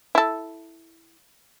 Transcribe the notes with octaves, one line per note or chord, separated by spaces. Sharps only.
E4 A4